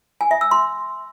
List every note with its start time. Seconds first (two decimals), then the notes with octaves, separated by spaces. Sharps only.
0.21 G#5
0.31 E5
0.41 E6
0.51 C6